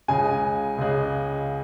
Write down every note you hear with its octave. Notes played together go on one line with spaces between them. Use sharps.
C#2 C#3 G#3 G#5
C#2 C#3 G#3